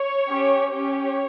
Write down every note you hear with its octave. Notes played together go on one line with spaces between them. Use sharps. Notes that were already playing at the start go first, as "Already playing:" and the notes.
Already playing: C#5
C#4 G4
C#4 G4 C#5